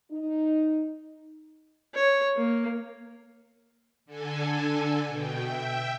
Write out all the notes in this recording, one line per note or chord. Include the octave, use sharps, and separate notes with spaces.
D#4
C#5
A#3
D3 A4 G#5
B2 G5
E5 G5